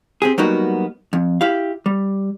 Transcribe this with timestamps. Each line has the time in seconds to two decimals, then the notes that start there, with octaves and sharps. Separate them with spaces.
0.22 C4 G4 G#4
0.38 F#3 G3 A#3 B3 D#4 F#4
1.13 F2
1.41 E4 G4 F5
1.86 G3